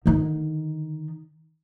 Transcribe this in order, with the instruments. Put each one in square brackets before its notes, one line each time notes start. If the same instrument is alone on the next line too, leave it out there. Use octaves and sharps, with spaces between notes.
[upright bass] D3 D#3